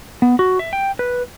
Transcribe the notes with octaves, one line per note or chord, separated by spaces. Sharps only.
B3
F#4
E5
G5
B4